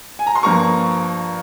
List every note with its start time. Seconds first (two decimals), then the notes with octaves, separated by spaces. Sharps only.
0.19 G#5
0.27 A#5
0.35 C6
0.43 G2 F3 A#3 A#5 C#6